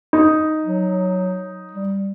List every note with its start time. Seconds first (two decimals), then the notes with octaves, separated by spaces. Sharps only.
0.13 D#4
0.65 F#3
1.73 G3